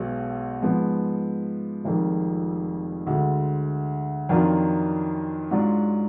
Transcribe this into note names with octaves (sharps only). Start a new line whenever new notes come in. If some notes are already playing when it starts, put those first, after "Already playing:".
Already playing: B1 B2 G#3 B3
G#2 F3 G#3 B3
F1 F2 D#3 G#3
D2 D3 G#3
F2 D#3 F#3 D4 F4
G#2 F#3 D4 F4